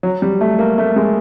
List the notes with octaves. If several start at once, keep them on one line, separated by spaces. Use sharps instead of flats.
F#3
G3
A3
A#3
A3
G#3